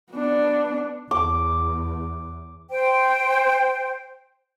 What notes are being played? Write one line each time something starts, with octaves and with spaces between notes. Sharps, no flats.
B3 D4
E2 D6
C5 G5